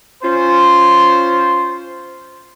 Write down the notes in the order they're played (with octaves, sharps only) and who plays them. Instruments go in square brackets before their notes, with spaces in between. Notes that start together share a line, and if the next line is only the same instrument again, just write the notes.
[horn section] C#4 F4 C5